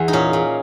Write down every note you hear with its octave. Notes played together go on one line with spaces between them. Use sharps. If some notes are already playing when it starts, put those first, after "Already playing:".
Already playing: E2 G#4
D#4
A#2 C#4
A#2